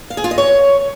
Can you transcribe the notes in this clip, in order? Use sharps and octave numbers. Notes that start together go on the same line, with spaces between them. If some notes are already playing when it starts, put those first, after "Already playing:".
F5
G#4
F4
D#5
C#5